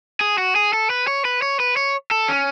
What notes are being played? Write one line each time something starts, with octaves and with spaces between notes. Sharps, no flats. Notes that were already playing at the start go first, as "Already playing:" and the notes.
G#4
F#4
G#4
A4
B4
C#5
B4
C#5
B4
C#5
A4
C#4